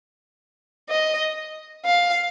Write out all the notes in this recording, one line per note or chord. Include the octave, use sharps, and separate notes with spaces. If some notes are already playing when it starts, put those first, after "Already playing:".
D#5
F5